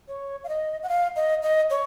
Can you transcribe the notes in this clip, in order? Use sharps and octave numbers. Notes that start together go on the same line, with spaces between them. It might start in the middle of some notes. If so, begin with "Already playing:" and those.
C#5
F5
D#5
F#5
F5
D#5
D#5
C#5